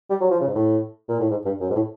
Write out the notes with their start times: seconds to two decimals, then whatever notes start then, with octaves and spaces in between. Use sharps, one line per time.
0.10 G3
0.21 F#3
0.31 F3
0.41 C#3
0.48 G#2
0.56 A2
1.09 A#2
1.20 A2
1.31 G#2
1.46 G2
1.60 F#2
1.70 G#2
1.75 A2